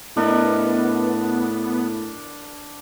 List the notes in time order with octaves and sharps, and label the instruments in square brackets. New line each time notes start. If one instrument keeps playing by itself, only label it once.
[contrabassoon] A2 [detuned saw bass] B3 [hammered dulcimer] D4 A#4 D#5